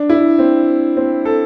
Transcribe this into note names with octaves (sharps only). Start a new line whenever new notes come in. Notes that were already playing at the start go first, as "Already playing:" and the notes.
Already playing: D4
E4
C4
C4
A4